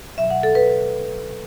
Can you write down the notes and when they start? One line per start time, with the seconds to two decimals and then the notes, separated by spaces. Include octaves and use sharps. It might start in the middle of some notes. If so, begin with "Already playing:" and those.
0.18 B2 F#3 E5
0.30 F#5
0.43 A4
0.55 B4